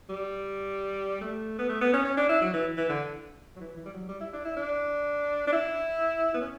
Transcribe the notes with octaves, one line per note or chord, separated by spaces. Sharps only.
G3
A3
B3
A3
B3
C#4
C#4
D4
E4
F#3
E3
E3
D3
F#3
E3
E3
G3
F#3
G3
E4
D4
E4
D4
D4
E4
B3
C#4